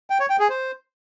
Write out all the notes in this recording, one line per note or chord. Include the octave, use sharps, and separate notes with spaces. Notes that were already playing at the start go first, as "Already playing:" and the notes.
G5
C#5
G5
G#4
C5